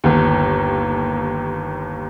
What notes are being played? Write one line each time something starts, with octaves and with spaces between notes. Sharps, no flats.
G1 D#2